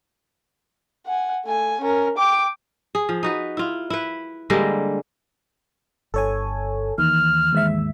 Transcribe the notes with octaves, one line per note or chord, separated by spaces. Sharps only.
F#5 G#5
A3 G#5
C#4 A#4
G5 D6
G#4
F3
D#4 F#4 B4
E4 F4
E4 B4
D3 G3 G#3 A#3
G1 A4 C#5 G#5
D#2 E3 F6
D#2 G#2 E5